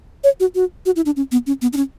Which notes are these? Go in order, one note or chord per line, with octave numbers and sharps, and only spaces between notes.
C#5
F#4
F#4
F#4
E4
D4
C#4
B3
C#4
B3
D4
C#4